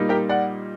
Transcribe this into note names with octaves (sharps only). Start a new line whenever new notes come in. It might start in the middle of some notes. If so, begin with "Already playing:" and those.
Already playing: A#2 G3 A#3 D#4
G4 A#4
D5 F#5